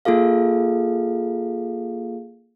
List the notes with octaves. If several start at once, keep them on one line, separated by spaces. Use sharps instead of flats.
A#3 F4 G#4 A4 F5